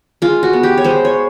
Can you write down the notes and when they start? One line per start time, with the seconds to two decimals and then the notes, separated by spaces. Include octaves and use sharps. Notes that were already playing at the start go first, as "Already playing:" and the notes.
0.22 G#3 F4
0.43 F#4
0.53 B3
0.63 G4
0.77 C#5
0.85 G#3 C5
1.05 C#5